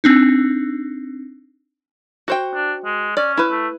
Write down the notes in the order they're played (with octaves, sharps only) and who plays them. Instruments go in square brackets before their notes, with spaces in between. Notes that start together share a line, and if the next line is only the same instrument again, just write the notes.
[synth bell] C4 D4 D#4
[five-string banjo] F#4 C5 G5
[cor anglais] D4
G#3
[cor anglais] C#4 [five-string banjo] D5
[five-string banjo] E4 B4
[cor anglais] A3